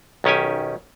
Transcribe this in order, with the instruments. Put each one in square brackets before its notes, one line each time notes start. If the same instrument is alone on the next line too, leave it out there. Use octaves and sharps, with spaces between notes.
[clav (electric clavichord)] B1 D#3 C#4 G4 G#5